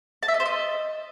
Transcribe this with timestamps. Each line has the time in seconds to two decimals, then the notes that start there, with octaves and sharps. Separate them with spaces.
0.23 A5
0.28 E5
0.34 D#5
0.40 C5
0.46 D#5